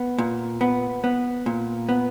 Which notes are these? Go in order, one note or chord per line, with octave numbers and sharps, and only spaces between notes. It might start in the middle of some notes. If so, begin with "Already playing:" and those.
Already playing: B3
A#2
B3
B3
A#2
B3